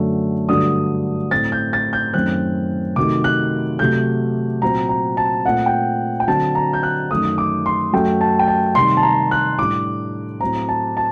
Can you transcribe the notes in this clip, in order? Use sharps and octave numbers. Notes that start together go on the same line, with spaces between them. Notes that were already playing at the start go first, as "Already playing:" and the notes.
Already playing: F#2 D3 F#3 A3
G2 D3 F#3 A3 D4 D#6
A2 A3 C4 A6
G6
A6
G6
F#2 D#3 A3 C4 F#6
C3 D#3 F#3 A3 D6
F#6
C3 F#3 A3 G6
A#2 F#3 C4 A#5
A#5
A5
A#2 A3 C4 F#5
G5
G5
D3 F#3 C4 A5
A#5
G6
F#6
F#2 D#3 A3 D#6
D6
C6
F#2 F#3 A3 G5
A5
G5
A5
C3 D#3 G3 C6
A5
A#5
F#6
A2 G3 D4 D6
A2 F#3 C4 A#5
A5
A5